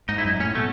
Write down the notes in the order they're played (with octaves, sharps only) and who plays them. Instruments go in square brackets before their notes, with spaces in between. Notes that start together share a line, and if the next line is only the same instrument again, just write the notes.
[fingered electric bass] G#2 [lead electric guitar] D#4
[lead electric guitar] E4
[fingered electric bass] F#2 [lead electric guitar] D#4
[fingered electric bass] G#2
[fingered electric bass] A2 [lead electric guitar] C#4
[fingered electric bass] B2 [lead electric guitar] A3